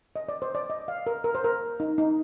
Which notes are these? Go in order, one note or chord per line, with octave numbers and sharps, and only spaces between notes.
D#5
D5
C5
D5
D#5
F5
A#4
A#4
C5
A#4
D#4
D#4